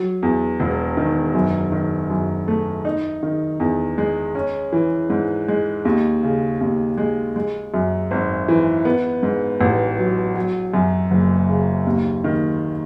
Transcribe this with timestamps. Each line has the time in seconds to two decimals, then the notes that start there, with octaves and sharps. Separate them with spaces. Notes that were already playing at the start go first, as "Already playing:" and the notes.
Already playing: F#3
0.23 E2
0.60 E1
0.97 D#3
1.35 F#2
1.72 D#3
2.10 F#2
2.48 A3
2.85 D#4
3.23 D#3
3.60 E2
3.98 G#3
4.35 C#4
4.72 E3
5.10 G#2
5.48 G#3
5.85 D#2
6.23 C#3
6.61 D#2
6.98 G#3
7.36 G#3
7.74 F#2
8.11 G#1
8.48 E3
8.85 B3
9.23 G#2
9.61 A1
9.98 F#3
10.35 F#3
10.74 F#2
11.11 F#1
11.49 C#3
11.87 D#2
12.24 D#3